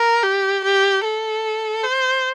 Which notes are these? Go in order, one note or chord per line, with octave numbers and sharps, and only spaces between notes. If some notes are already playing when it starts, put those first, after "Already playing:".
Already playing: A#4
G4
G4
A4
C5